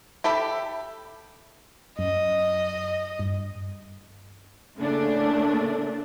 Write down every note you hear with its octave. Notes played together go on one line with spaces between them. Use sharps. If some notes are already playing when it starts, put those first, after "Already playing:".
G4 A4 E5 B5
F#2 D#5
G2
A2 C#3 A3 A#3 D4